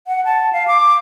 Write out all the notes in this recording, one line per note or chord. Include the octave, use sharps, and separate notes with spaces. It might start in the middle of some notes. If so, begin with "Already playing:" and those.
F#5
A5
F5
D6